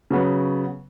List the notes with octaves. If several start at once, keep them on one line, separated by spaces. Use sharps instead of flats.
C#3 F#3 B3